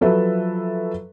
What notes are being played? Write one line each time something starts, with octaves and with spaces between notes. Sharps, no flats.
F3 F#3 A4 B4 E5